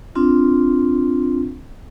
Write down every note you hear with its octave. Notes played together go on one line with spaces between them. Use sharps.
C4 D4 F4